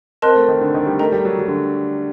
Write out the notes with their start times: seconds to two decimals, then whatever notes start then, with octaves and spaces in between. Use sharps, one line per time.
0.22 C4 A#4 D#5 A5 C6 F#6
0.36 A3
0.48 D#3
0.61 D3
0.74 D#3
0.86 G3
0.99 A3 A#4 D#5 G5 A#5
1.12 G3
1.25 F#3
1.39 F#3
1.48 D3